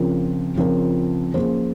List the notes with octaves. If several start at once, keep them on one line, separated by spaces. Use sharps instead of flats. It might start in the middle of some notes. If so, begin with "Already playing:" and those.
Already playing: C#3 F3 C4 F4 A#4
C#3 F3 C4 F4 A#4
F3 A#3 C#4 G#4 C5